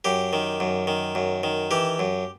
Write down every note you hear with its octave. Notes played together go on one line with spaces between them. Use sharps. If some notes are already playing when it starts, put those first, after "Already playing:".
F#2 G4
D#3
F#2
D#3
F#2
D#3
E3 G4
F#2